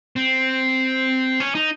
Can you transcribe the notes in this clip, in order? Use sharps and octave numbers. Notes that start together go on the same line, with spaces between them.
C4
C#4
D#4